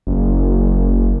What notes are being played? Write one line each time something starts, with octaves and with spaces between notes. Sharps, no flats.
F#1